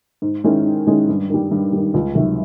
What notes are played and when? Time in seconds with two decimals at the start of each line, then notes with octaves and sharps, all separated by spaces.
0.22 G#2
0.44 D#3 G#3 C#4 E4
0.65 G#2
0.87 D#3 G#3 C#4 E4
1.09 G2
1.30 D#3 G3
1.51 G2
1.73 D#3 G3
1.94 C#2
2.15 C3 D#3 F#3